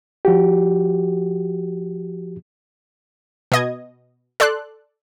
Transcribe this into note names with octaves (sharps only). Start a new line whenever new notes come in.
F3 F#4 G4
B2 D#5 G#6
A4 D5 C6 F#6